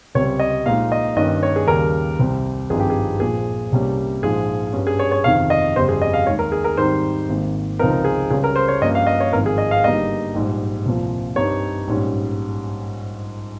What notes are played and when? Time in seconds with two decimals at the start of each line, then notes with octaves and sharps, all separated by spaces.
0.15 C#2 C3 G3 C4 C#5
0.39 D#5
0.66 A#1 A#2 G#3 D#4 F5
0.92 D#5
1.16 G2 D#3 A#3 C#4 D#5
1.43 C#5
1.56 G#4
1.67 D#2 C#3 G3 A#4
2.19 C2 C3 G3 C4
2.70 G#1 G2 F3 C4 D#4 G#4
2.80 G4
2.90 G#4
3.20 A#1 A#2 F3 G#4
3.72 C2 C3 G3 A#3 C#4
4.23 A#1 G#2 F3 G#4
4.73 G2 G3 C#4
4.87 G#4
4.99 C#5
5.12 C#5
5.24 G1 F2 C3 D#3 F5
5.50 D#5
5.75 G1 F2 C#3 G3 C5
5.89 G#4
6.02 D#5
6.14 F5
6.27 D#2 D#3 G#3 C#5
6.39 A#4
6.52 G#4
6.64 A#4
6.77 G#2 D#3 G3 C4 D#4 C5
7.29 G#1 G#2 D#3 A#3
7.79 C#2 C3 F3 C4 D#4 A#4
8.05 G#4
8.30 C#2 C#3 G3 C#4 G#4
8.44 A#4
8.56 C5
8.68 C#5
8.81 G2 F3 A#3 C#4 D#5
8.95 F5
9.07 D#5
9.20 C#5
9.33 G#1 G#2 F3 A#4
9.46 G#4
9.58 D#5
9.71 F5
9.84 G1 G2 G3 A#3 D#4 D#5
10.34 A#1 G#2 G3
10.86 C2 A#2 F3
11.36 G2 G3 C4 D#4 C#5
11.87 A#1 G#2 G3 C#4